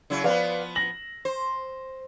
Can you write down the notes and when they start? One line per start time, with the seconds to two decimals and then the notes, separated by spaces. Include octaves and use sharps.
0.10 C#3 F#3 E4
0.24 F3 B3 B4 D5 F5
0.75 A#6 F#7
1.25 C5